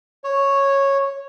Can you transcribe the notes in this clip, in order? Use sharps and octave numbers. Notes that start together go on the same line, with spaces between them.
C#5